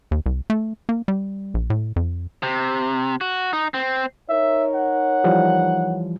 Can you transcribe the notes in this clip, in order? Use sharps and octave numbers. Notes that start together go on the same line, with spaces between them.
D#2
C2
A3
A#3
G3
A#1
A2
F2
C3
F#4
D#4
C4
D#4 A#4 C#5 E5
F#5
E3 F3 G3